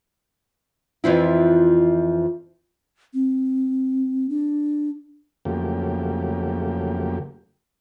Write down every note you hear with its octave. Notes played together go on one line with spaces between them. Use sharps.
F2 E3 F3 E4
C4
D4
F2 C#3 F#3 A3 A#3 G4